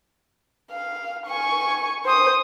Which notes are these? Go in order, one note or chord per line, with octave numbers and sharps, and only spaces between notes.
F5
G#5 C#6
C5 D#6